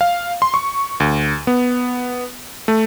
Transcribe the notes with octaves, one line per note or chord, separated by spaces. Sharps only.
F5
C6
C#6
D2
B3
A3